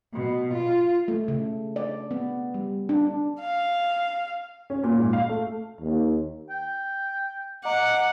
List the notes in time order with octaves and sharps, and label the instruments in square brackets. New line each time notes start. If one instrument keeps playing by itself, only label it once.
[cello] B2
F4
[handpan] A3
C#3
D5
B3
G3
D4
[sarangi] F5
[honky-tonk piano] C#4
A#2
G#2
F5
A3
[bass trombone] D#2
[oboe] G5
[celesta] D#5 A#5 [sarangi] F#5 [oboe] D6